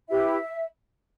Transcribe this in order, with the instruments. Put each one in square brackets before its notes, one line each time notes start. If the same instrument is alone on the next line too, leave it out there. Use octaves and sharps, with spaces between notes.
[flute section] E4 G4 B4 E5